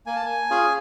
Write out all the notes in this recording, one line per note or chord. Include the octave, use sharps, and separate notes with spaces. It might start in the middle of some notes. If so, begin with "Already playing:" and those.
A#3 G#5
A5
G#5
C#4 F4 G#4